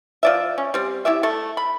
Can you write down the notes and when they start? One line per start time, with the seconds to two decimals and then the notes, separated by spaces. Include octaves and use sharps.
0.23 F3 D5 E5
0.58 C#4
0.74 G3 C4
1.05 E4 G4 D5 E5
1.23 A3 A4
1.57 B5